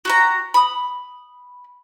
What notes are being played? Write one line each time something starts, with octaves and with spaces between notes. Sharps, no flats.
F#4 G4 A#5
B5 D#6